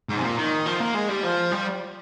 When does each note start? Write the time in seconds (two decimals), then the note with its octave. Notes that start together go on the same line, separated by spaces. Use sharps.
0.09 G#2
0.17 C3
0.23 A#2
0.38 D#3
0.66 F3
0.80 A#3
0.95 G#3
1.09 G3
1.23 F3
1.51 G3